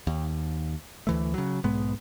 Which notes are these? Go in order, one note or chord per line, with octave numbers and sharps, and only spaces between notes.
D#2
D2 E3 A3
C#3 F#3
B1 G#2 G#3 B3